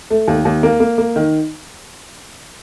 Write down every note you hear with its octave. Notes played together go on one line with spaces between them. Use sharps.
A3
D#2
D#2
A#3
A#3
A#3
D#3